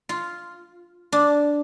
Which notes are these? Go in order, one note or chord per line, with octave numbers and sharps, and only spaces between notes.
F4
D4